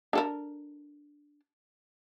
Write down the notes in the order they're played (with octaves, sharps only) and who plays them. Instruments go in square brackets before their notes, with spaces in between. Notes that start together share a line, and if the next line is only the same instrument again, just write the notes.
[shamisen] D4 A4 A#4